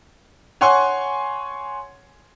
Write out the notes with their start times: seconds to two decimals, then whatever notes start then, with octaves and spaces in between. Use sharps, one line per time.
0.61 C#5 F#5 G#5 C6 C#6